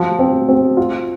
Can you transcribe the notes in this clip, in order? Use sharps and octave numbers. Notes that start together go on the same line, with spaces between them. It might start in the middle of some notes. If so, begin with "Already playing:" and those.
Already playing: F3
C4
C4
F4